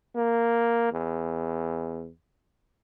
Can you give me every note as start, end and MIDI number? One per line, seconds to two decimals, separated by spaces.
0.16 0.91 58
0.93 2.09 40